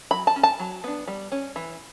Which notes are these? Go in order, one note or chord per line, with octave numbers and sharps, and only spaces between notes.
F#3 B5
A5
C#4
A5
F#3
B3 D4
G3
C#4
E3